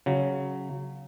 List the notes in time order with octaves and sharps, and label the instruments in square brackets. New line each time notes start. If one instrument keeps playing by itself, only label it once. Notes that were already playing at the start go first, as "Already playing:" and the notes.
[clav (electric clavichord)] C#3 F#3